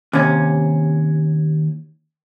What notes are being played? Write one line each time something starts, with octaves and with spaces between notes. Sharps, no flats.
D#2 C3 C#4